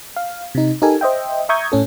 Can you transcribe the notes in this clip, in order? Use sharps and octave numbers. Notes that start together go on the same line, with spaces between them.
F5
C3 D#4
D#4 G4 A4 A#4 G#5
C5 D#5 E5 G5
E5 A#5 C#6 D#6 G6 G#6
A2 C#4 A4